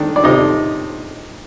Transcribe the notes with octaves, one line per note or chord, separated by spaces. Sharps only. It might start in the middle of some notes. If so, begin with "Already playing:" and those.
Already playing: D#3 D4
D5
C3 D#4 D#5